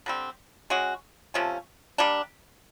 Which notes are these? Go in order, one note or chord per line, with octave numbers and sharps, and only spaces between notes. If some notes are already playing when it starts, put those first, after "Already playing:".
D3 G3 C4
G#3 C#4 F#4
C3 F3 A3 C#4
G3 A#3 D4